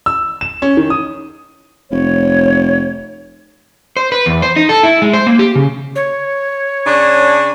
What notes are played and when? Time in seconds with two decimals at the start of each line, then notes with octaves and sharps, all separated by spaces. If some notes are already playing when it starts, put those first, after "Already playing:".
0.06 E6
0.41 E7
0.62 C#4
0.77 D#3
0.90 D#6
1.91 F1 C#5
3.97 C5
4.12 B4
4.26 E2
4.42 C5
4.56 D#4
4.69 A4
4.83 E4
5.02 G#3
5.13 C5
5.26 A#3
5.39 G4
5.56 C#3
5.96 C#5
6.86 C#3 D4